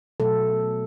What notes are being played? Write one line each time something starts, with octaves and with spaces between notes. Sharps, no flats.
B2 F#3 A3 A4